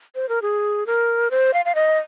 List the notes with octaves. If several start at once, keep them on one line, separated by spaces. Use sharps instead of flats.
C5
A#4
G#4
A#4
C5
F5
F5
D#5